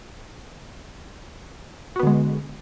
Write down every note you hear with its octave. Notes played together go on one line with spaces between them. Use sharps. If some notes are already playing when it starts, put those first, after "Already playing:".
D3 G#3 B3 F#4